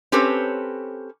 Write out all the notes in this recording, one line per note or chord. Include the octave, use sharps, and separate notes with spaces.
C4 C#4 G4 A4 B4 C#5